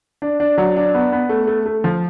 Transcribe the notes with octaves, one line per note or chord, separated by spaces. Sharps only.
D4
D4
F#3
D4
B3
B3
A3
A3
A3
F3